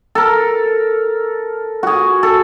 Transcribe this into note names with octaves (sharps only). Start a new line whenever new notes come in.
A4 A#4
F#4 G#4
A4